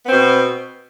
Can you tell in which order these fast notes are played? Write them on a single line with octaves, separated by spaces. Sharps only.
B3 C4 B2